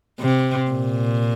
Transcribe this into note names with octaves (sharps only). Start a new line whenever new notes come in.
C3
A#2